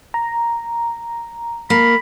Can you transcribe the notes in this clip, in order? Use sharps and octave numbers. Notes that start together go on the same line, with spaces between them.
A#5
A#3 B5